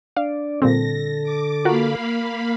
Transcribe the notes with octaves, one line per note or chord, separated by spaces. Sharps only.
D4 D5 F5
A#2 D3 G3 C4 A4 A#6
D6
A#3 F4 F#4 A#4 F5 B5